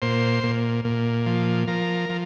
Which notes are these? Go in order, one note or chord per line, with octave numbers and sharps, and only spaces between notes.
A#2 C5
A#2
A#2
F3
F3 A#4
F3